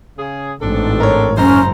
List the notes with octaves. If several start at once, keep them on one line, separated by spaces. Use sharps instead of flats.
C#3 G#4
A1 G#2 C4 D4 A4
A#4 C#5
F#1 C#4 C5 A#5